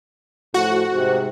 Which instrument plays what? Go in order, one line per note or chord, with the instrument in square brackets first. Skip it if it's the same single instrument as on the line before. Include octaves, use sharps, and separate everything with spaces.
[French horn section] A2 F3 [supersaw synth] F#4 F#5
[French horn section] G#2 C3